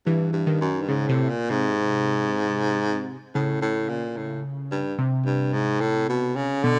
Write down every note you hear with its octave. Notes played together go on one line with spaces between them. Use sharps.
G2 E3
G2
D#3
F#2
G2
G#2 C#3
A2 C3
A#2
G#2 C3
A2 C#3
A2
A#2
A2
G2
C3
G2
G#2
A2
B2
C#3
B2 D3